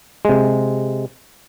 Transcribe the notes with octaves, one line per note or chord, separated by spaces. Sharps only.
C3 G#3